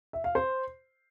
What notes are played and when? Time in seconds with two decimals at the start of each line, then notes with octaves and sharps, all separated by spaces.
0.13 E5
0.24 F5
0.35 C5